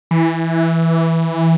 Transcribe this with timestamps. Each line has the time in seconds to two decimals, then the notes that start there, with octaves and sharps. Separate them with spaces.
0.11 E3